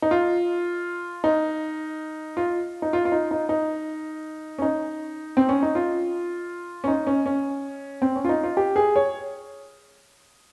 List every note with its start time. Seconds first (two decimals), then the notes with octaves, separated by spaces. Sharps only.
0.02 D#4
0.11 F4
1.24 D#4
2.37 F4
2.82 D#4
2.93 F4
3.05 F4
3.12 D#4
3.31 D#4
3.49 D#4
4.58 C#4
4.62 D#4
5.37 C4
5.49 C#4
5.63 D#4
5.75 F4
6.84 C#4
6.88 D#4
7.07 C#4
7.26 C#4
8.02 C4
8.16 C#4
8.25 F4
8.29 D#4
8.44 F4
8.57 G4
8.76 G#4
8.96 C#5